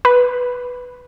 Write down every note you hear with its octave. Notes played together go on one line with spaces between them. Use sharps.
B4